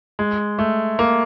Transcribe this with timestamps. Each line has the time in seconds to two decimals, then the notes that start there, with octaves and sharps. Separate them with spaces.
0.19 G#3
0.59 A3
0.99 A#3